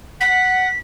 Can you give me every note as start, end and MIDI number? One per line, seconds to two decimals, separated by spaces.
0.21 0.69 78
0.21 0.79 95